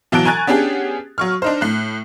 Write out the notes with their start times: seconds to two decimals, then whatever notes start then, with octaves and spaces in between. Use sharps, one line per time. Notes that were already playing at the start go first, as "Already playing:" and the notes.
0.12 B2 E3 F#3 A5 F#6 D7
0.25 G#5 A#5 C#6 F#6 G#6 A6
0.47 B3 C#4 D4 G4 G#4
1.18 F#3 C#6 F6
1.42 D4 D#4 C5
1.61 A2 F#6